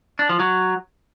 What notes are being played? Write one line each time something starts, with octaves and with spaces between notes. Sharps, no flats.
D4
F3
F#3